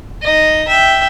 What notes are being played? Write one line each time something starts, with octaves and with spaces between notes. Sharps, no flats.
D#4 D#5
E5 G5